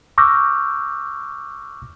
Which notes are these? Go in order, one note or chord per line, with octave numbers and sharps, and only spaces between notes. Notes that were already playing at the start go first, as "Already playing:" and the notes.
C#6 D6 E6 F6 G6 A#6